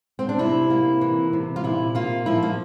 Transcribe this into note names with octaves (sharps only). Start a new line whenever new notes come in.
C4
D4
C3 E4
A#3
E3
C3
F4
A#2 E4
A#3 F4
F3 E4
A#3